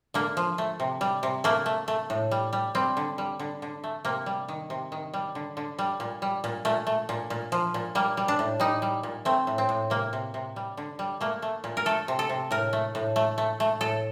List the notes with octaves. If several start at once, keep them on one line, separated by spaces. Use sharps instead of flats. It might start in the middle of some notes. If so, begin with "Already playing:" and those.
D3 A#3
F3
A3
C3
G3
C3
A3 A#3
A3
A3
A2
G3
G3
G3 C4
D3
G3
D3
D3
A3
C3 A#3
G3
D#3
C3
D#3
G3
D3
D3
G3
A#2
G3
A#2
A#2 A3
A3
A#2
A#2
F3
A#2
G3 A#3
G3
D4
A2
G3 D#4
G3
A#2
A3 C4
A2
C4
A2
C3 A#3
C3
C3
G3
D3
G3
A3 A#3
A3
A#2
A#4
A3 A4
C3
A4
C3
A2 A#4
A3
A2
A3
A3
A3
A2 A4